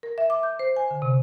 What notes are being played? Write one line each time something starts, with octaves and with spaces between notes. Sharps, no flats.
A#4
E5
D6
G6
C5
G#5
D3
C3